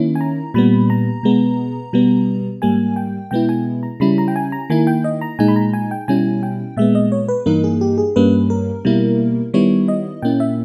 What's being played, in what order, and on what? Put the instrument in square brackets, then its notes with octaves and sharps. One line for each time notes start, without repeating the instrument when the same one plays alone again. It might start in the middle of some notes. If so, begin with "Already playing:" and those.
Already playing: [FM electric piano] D#3 A#3 C#4 E4
G#5
A#5
A#2 G3 B3 B5
A#5
B2 G#3 B3
B2 G3 B3
G#2 G3 A#3 G#5
G5
B2 G#3 B3 E4 G5
G#5
A#5
C#3 G3 C#4 E4 B5
A#5
G5
G#5
A#5
D#3 A#3 E4 G#5
G5
D#5
A#5
A#2 G#3 D#4 G#5
B5
A#5
G#5
G5
B2 G3 C#4 E4 G#5
G5
A#2 G#3 B3 E5
D#5
C#5
B4
G2 E3 A#3 D#4 A#4
G#4
G4
G#4
G2 G3 A#3 C#4 B4
A#4
B2 G3 A#3 E4
D#3 G3 B3 E4 C#5
D#5
A#2 A#3 C#4 E4 G5
E5